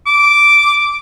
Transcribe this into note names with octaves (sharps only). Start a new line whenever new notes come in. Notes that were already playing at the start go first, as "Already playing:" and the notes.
D6